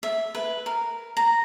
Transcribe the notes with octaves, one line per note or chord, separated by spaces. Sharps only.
E5
B4
A#4
A#5